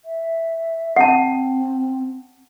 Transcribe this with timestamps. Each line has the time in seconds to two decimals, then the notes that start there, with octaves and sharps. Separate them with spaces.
0.04 E5
0.96 C4 F#5 A5